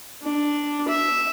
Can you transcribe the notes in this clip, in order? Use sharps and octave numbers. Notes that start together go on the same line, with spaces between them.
D4
E5